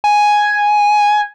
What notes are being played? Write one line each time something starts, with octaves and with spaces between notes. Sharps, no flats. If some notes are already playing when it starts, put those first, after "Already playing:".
G#5